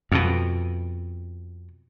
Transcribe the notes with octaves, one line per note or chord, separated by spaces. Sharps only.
F2 B2